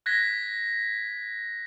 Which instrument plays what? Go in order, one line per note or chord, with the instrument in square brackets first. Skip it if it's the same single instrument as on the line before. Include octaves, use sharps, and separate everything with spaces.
[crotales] F#6 G#6 A#6 B6